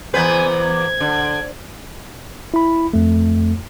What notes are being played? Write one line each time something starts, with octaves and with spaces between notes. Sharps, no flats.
E2 B3 B4 C5 G#5
G#6
D3
E4 B5
F2 A3